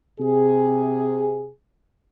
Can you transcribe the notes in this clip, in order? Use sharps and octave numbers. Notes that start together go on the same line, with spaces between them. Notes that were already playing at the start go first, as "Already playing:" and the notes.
C3 G#4